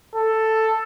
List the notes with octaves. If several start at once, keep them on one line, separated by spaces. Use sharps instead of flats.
A4